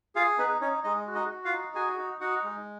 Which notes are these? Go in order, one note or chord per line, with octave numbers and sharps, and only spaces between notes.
F4 G#4 F5
B3 D#4 B4
C#4 D#4 C#5
G#3 D#4 D#5
F#4
D#4 D#5
F#4
F4 F5
D#4
F#4 G#4 G#5
D#4
D#4 F#4 F#5
G#3